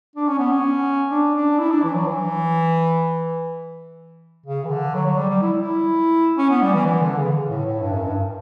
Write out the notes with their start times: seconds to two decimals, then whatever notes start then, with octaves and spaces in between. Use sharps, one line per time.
0.15 D4
0.28 C#4
0.39 B3
0.52 C#4
1.11 D4
1.35 D4
1.59 E4
1.71 D4
1.83 E3
1.94 F#3
2.06 E3
4.46 C#3
4.65 E3
4.70 D3
4.95 F#3
5.06 F#3
5.18 G3
5.30 G3
5.42 E4
5.60 E4
6.38 C#4
6.50 B3
6.62 G3
6.74 E3
6.86 E3
7.02 D3
7.18 C#3
7.50 A2
7.65 A2
7.82 G2
7.93 F#2
8.05 G2